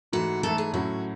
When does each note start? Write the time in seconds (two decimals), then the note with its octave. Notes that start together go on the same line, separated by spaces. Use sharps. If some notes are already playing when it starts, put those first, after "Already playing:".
0.13 G#2 E3 A3 F#4
0.43 G#2 E3 A3 A4
0.58 G#4
0.73 A2 F#3 C#4 E4 F#4